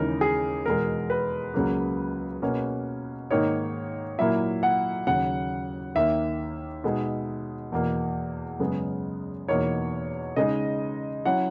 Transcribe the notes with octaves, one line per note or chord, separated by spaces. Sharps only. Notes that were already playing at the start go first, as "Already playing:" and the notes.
Already playing: D#2 C#3 E3 G#3 D#4 A#4
G#4
E2 B2 G#3 A#4
B4
C#2 C#3 F#3 A#3
B2 A#3 C#4
G#2 D#3 A#3 D#4 C#5
A#2 F#3 A#3 E4 E5
F#5
D#2 C#3 F#3 F#5
D#2 D#3 A#3 E5
B2 G#3 D#4
E2 B2 A#3
F#2 C#3 G#3 B3
E2 B2 A#3 D#4 C#5
C#3 G#3 D#4 D#5
F#3 C#4 E4 F#5